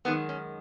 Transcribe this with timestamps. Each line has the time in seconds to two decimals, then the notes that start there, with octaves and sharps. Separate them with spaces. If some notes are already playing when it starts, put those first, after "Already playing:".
0.05 F#2 D#3 G#3 B3
0.29 C#4